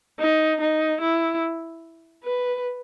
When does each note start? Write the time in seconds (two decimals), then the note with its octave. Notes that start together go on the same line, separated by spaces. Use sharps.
0.20 D#4
0.61 D#4
1.01 E4
2.24 B4